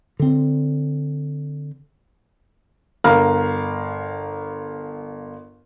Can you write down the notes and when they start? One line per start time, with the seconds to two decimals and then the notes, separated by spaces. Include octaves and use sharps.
0.19 D3 C4
3.04 G1 A#4 F5 A#5 F6